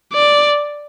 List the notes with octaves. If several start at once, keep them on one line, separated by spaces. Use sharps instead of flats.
D5